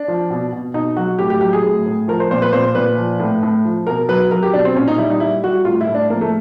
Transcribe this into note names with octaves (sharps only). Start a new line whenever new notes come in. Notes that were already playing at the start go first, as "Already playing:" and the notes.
Already playing: D4
F3
B2
B2
B2 D#4
F#3 F#4
A2 G4
G4
F#3 G4
G#4
A2
A2
F3 A#4
C5
A#2 C5
B4
A#2 C5
A#2 B4
F3
A2
A2
F3
B2 A#4
F#3 B4
F#3 A#4
G4
B2 D4
C4
A#2 C#4
D#4
G3 E4
D#4
G3 E4
G3 F#4
A2 F4
E4
A2
D4
F3 A#3
A3